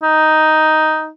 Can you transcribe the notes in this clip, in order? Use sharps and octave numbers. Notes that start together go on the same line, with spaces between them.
D#4